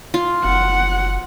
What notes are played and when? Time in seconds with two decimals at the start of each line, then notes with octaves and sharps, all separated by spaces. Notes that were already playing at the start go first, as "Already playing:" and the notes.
0.14 F4
0.44 F#1 F#5